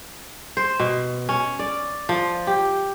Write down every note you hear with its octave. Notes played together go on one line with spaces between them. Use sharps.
C5
B2
C#4
D5
F3
G4